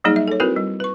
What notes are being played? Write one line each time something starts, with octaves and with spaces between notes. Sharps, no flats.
F#3 G3 A#3 D#4 G#4 D#5
E5
A4 C#5
C4 E4 F#4 A#4 B4
G3
B4 C#6